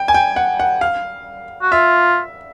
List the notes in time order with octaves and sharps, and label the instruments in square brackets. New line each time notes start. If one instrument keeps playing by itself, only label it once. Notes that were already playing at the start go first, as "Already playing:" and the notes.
Already playing: [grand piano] G5
G#5
G5
F#5
F#5
F5
[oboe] F#4
[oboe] F4 [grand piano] E5